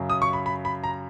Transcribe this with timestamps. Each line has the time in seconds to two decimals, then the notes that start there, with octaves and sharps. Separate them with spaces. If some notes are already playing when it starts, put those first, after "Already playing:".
Already playing: F#2 C#3 F#3
0.10 D#6
0.22 C#6
0.33 B5
0.46 B5
0.65 B5
0.84 A#5